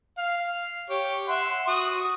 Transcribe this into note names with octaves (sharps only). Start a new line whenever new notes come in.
F5
G4 C#5
E5 F#5 C6
F#4 D#6